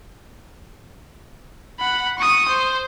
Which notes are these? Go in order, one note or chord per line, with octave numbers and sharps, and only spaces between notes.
F#5 B5
C#6 D#6
C5